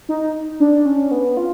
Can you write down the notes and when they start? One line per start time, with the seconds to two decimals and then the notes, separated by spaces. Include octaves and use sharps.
0.09 D#4
0.60 D4
0.86 C#4
1.11 B3
1.37 F4